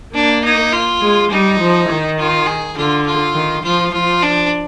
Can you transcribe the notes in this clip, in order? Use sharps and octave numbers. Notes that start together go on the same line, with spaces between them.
A#3 D4
D#4
F4
G#3
G3 D#4
F3
D#3
F4
G#4
D3 F4
F4
D#3
F3 F4
F3 F4
D4